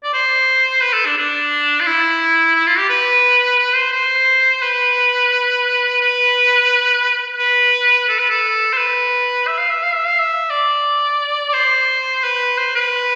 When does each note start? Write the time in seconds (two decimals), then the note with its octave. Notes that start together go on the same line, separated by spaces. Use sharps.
0.04 D5
0.14 C5
0.82 B4
0.93 A4
1.06 D4
1.17 D4
1.81 F4
1.86 E4
2.55 E4
2.66 F4
2.78 G4
2.89 B4
3.59 B4
3.76 C5
3.93 C5
4.62 B4
6.01 B4
7.38 B4
8.08 A4
8.19 B4
8.30 A4
8.73 C5
8.77 B4
9.47 E5
9.58 F5
9.70 E5
9.83 F5
9.95 E5
10.06 F5
10.19 E5
10.50 D5
11.49 D5
11.53 C5
12.24 B4
12.58 C5
12.75 B4